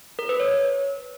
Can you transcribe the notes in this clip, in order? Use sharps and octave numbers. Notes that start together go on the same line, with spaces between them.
A#4
B4
C#5